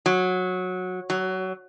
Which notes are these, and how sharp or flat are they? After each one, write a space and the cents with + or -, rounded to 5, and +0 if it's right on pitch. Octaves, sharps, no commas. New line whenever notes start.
F#3 -15
F#3 +20